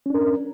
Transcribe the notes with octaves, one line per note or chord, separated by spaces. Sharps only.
C#4 D4 A#4